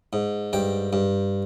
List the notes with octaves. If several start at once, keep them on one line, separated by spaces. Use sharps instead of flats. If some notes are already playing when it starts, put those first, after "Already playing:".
G#2
G2 G5
G2